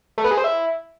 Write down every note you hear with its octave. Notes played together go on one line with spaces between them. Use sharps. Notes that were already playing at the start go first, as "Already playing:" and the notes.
A3
B3
G#3
C4
E4